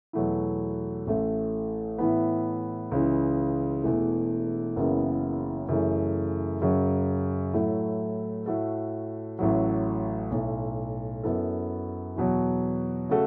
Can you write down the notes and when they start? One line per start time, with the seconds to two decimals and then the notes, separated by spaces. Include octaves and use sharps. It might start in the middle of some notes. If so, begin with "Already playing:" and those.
0.13 E2 B2 F#3 A3 E4
1.07 A1 A2 A3
1.98 A2 E3 B3
2.92 C#2 C#3 E3
3.83 E1 E2 E3 A3
4.76 F#1 F#2 C#3 E3 B3
5.69 F#2 C#3 E3 A3
6.62 F#2 C#3 F#3
7.54 A2 F#3 A3 E4
8.46 A2 A3 F#4 A4
9.39 A1 A2 F#3
10.31 B1 A2 A3
11.23 F#2 F#3 B3 E4 A4
12.16 E2 B2 F#3
13.09 C#3 A3 F#4 A4